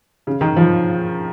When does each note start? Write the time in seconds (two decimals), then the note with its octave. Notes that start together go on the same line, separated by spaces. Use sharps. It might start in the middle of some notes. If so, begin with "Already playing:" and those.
0.27 C#3
0.41 D#3
0.56 F3